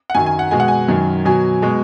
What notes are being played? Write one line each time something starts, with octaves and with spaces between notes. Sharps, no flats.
F#5
F#2 D#3 F#3 G#5
G#5
F#5
B2 G#3 G#5
F#5
G#5
F#2 D#3 F#3
B2 F#3 G#5
B2 G#3